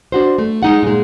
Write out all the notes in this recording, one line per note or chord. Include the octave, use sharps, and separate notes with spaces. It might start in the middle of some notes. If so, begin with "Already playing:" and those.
D4 F#4 C5
A3
G#3 D#4 F#5
A#2 G#3